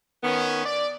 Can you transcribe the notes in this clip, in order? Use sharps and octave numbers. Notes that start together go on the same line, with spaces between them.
D#3 B3 C#4
D5